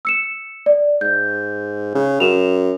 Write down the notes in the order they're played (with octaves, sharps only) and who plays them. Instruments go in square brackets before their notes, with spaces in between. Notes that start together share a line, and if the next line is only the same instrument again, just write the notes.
[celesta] E6 C#7 E7
D5
[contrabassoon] G#2 [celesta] G6
[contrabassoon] C#3
[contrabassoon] F#2 [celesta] E7 F7